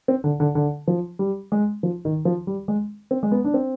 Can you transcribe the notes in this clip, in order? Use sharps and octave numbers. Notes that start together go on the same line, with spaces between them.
C4
D3
D3
D3
F3
G3
G#3
F3
D#3
F3
G3
G#3
C4
G#3
B3
D4
C4